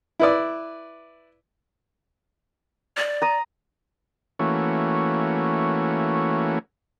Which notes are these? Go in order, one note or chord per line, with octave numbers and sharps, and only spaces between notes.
E4 B4 D5
D5
A#5 D#6
E3 A3 A#3 C#4 F#4